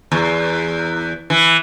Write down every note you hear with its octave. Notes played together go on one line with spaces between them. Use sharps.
E2
E3